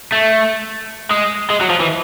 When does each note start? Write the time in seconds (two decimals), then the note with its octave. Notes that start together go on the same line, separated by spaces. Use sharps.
0.12 A3
1.11 G#3
1.50 G#3
1.61 F#3
1.70 F3
1.81 E3